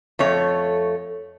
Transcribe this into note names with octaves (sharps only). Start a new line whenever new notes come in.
F2 A3 C#5